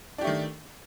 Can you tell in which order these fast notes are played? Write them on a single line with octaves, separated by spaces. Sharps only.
D4 G4 A3 D#3